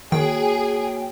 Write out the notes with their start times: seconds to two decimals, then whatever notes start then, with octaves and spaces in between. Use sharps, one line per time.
0.12 D#3 A#3 F#4 G#4 C#5 G5